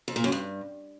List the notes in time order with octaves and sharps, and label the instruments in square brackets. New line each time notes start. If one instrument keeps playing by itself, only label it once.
[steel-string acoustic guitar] F2
A#2
F#2
G2